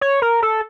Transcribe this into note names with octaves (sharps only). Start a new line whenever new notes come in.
C#5
A#4
A4